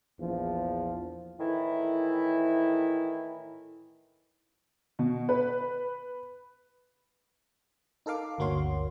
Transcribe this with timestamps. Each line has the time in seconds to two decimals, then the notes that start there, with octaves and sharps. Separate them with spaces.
0.20 A#1 E2 F3
1.40 A2 D#3 E3 E4
4.99 B2
5.29 B4
8.06 D#4 A4 A#4 F5 D6
8.38 G1 D2 A#3 F#4 C#5 C6